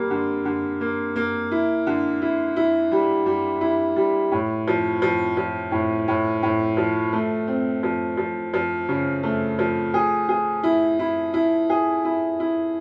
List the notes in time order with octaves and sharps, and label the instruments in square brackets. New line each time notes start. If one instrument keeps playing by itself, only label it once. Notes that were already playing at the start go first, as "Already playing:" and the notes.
Already playing: [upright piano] G3 A#3
D3
D3
A#3
A#3
E4
D3
E4
E4
G3
G3
E4
G3
A2
F3
F3
F3
A2
A2
A2
F3
A3
C4
F3
F3
F3
C#3
A3
F3
G#4
G#4
E4
E4
E4
G#4
E4
E4